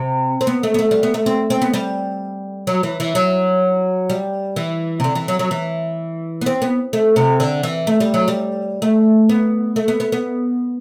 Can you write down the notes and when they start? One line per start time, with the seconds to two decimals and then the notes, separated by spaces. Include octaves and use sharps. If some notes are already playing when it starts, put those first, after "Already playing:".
Already playing: C3
0.41 C4
0.47 B3
0.63 A3
0.74 B3
0.79 A3
0.91 G3
1.03 B3
1.14 A3
1.26 C4
1.50 C4
1.62 B3
1.74 G3
2.67 F#3
2.83 E3
3.00 E3
3.15 F#3
4.10 G3
4.56 E3
5.00 C3
5.04 D3
5.15 E3
5.28 F#3
5.39 F#3
5.51 E3
6.41 B3
6.46 C4
6.62 B3
6.93 A3
7.16 C3
7.40 D3
7.63 E3
7.87 A3
8.00 G3
8.14 F#3
8.28 G3
8.82 A3
9.29 B3
9.76 A3
9.88 B3
10.00 B3
10.12 B3